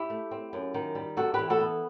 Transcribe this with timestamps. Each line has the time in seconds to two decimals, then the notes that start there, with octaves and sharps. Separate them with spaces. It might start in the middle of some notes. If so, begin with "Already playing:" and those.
Already playing: E4 G4
0.10 A3
0.31 C4
0.53 F#2
0.74 D#3
0.95 G3
1.17 C3 F#4 A4
1.34 E3 G4 B4
1.50 F#4 A4
1.60 B3